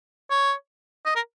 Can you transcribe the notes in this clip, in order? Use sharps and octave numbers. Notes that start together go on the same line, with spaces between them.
C#5
D#5
A#4